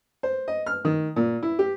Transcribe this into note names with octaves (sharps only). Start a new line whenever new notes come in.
C5
D#5
F6
D#3
A#2
E4
G4